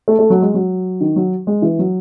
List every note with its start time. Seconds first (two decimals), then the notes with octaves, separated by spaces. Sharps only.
0.08 A3
0.19 A3
0.30 F#3
0.42 G#3
0.54 F#3
1.01 D#3
1.16 F#3
1.47 G#3
1.62 E3
1.79 F#3